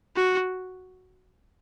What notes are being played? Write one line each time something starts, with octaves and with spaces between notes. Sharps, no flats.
F#4